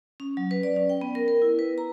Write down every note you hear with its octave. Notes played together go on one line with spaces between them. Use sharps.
C#4
F#3
B4
D5
C#4
G5
B3
A#4
A#4
E4
B4
A#5